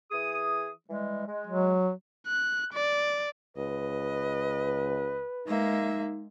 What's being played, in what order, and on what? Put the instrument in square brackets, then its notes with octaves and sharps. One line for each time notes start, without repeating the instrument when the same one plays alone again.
[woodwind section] E3 G#4 D#6
E3 G3 G#3
G#3
[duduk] F#3
[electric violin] F#6
D5
[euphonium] C#2 [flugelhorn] B4 [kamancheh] D#5
[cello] G#3 [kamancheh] A#3 E5 [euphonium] D#4